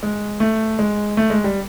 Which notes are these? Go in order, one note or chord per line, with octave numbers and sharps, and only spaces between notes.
G#3
A3
G#3
A3
G#3
G3